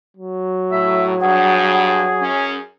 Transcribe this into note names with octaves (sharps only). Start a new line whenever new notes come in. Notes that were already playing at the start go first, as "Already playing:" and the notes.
F#3
A2 E5
G2 G#4 F#5
F#2 C#4